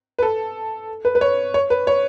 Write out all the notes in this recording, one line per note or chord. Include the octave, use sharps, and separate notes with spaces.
B4
A4
B4
B4
C#5
C#5
B4
C#5